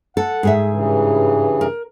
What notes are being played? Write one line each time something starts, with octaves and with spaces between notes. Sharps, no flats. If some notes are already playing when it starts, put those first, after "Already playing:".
A4 F#5
G#2 G#4 E5
G2 C#3 E3
A#4